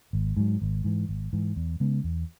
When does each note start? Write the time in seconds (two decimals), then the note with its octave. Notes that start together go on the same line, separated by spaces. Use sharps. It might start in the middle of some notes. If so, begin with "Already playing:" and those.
0.13 G#1
0.37 G#2 F#3
0.62 G#1
0.84 G#2 E3
1.09 G#1
1.33 G#2 E3
1.56 E2
1.80 C#3 G#3 B3
2.04 E2